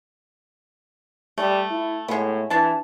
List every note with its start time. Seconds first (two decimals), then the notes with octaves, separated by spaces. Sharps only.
1.38 G3 A3
1.71 E4
2.08 A2 G#3 B3
2.50 E3 D4 A5